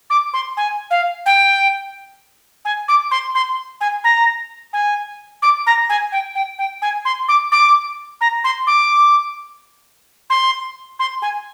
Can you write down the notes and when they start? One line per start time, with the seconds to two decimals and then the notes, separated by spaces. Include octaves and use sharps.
0.10 D6
0.33 C6
0.57 G#5
0.91 F5
1.26 G5
2.65 G#5
2.88 D6
3.11 C6
3.35 C6
3.81 G#5
4.04 A#5
4.73 G#5
5.42 D6
5.67 A#5
5.89 G#5
6.12 G5
6.35 G5
6.59 G5
6.82 G#5
7.05 C6
7.28 D6
7.52 D6
8.21 A#5
8.44 C6
8.67 D6
10.30 C6
10.99 C6
11.22 G#5